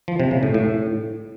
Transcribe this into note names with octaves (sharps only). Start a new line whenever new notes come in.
F3
C3
C#3
A2
A2